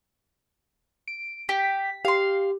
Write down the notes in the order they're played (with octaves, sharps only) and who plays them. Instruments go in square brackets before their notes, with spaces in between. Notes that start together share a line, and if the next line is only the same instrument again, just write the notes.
[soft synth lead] D7
[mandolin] G4 [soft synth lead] B6
[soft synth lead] G4 [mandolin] F5 C6